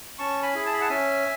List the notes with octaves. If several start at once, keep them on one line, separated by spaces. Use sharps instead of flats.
C#4 A5 C#6
G#5 B5
E4 G#4
A5
B5
F#5 A5
C#4 E5 G#5